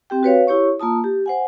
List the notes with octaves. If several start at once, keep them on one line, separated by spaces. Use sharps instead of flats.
C4 G4 G5
F#4 B4 C#5 F5
E4 G4 C#5 C#6
A#3 F4 A5 D#6
G4
C5 F#5 G#5